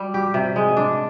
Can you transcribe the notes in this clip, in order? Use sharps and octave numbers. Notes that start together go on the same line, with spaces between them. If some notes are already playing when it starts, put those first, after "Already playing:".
Already playing: G3
G4
C3
G#3
D4